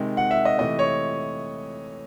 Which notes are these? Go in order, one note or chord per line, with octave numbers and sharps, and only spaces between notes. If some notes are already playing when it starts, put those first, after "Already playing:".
Already playing: C3 D#3 G#3
F#5
E5
D#5
C3 E3 A3 D#5
C#5